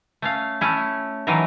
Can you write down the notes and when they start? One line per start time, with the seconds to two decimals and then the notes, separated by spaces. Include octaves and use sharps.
0.22 A3 C#4 F5
0.61 A3 C#4 E4
1.27 D#3 E3 F#3 A3 A#4